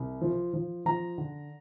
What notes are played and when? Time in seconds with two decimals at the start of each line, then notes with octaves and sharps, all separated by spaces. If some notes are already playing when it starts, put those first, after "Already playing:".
Already playing: C2
0.21 F3
0.53 F3
0.86 F3 A#5
1.18 D3